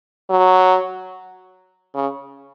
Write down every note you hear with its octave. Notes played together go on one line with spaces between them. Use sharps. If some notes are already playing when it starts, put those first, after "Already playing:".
F#3
C#3